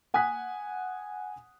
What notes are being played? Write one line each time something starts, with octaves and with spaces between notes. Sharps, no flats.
F#5 G#5 D#6 F#6 B6